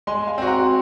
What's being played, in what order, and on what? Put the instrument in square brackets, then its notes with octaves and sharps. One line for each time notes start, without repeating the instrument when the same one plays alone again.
[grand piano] G#3 [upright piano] G#5 C6
[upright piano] F5 G#5
[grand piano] C4 F#4
[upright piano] F#5 A#5